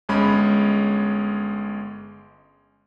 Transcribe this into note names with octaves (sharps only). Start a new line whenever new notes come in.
G1 G#3 C#4 B5